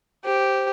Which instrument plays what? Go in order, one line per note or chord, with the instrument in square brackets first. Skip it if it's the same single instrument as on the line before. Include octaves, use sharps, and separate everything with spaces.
[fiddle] G4 [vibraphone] C5